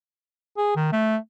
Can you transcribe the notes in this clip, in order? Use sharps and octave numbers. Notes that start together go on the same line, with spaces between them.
G#4
D#3
A3